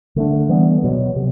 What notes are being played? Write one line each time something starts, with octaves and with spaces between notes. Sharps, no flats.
D3 A3 D4
E3 G3 B3
B2 F#3 B3
C3